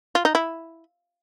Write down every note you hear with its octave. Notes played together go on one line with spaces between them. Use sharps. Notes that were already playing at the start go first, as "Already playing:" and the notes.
F4
D#4
E4